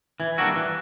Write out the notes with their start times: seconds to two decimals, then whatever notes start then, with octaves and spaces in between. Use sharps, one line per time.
0.20 E3 G#6
0.37 G3 A#3 D4 F#4 E6
0.55 E3 F#6